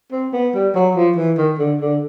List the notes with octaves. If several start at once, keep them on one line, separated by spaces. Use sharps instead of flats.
C4
B3
G3
F#3
F3
E3
D#3
D3
D3